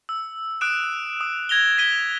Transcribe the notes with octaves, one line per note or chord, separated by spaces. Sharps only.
E6
D#6 F#6 D7 E7
D#6
G#6 A#6 F7 G7
G#6 B6 D#7 G7